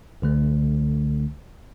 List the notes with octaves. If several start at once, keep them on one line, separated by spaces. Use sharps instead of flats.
C#2 D3 A3